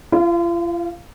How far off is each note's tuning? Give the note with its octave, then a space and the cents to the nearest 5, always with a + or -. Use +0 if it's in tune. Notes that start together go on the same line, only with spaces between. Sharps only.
F4 -40 F5 +0